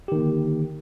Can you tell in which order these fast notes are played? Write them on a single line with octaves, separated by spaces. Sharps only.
G4 D#3 A#3 D3